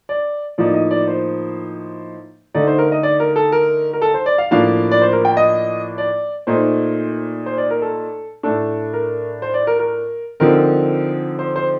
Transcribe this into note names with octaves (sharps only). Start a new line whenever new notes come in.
D5
A2 F3 A#3 D#4 D5
D#5
D5
C5
D3 A3 D#4 D5
C5
A#4
D#5
D5
A#4
A4
A#4
A#4
A4
C5
D5
F5
A2 F3 A#3 D4 F5
D5
C5
A#4
G5
D#5
D5
A#2 A3 D#4 C5
C5
D5
A#4
A4
A2 A3 D4 A4
A#4
C5
D5
A#4
A#4
D3 F3 C4 D#4 A#4
C5
C5